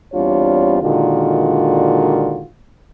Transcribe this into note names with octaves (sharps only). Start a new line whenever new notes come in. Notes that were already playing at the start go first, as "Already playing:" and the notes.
E2 G3 C4 D4 F4 C#5
A#2 D3 D#3 G#3 F4 F#4